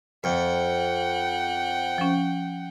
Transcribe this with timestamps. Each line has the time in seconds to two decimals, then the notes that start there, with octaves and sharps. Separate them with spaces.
0.24 F2 F#5 G5
1.98 F3 C#4